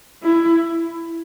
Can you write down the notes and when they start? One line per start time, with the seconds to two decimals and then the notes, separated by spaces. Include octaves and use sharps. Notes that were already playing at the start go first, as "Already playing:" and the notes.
0.23 E4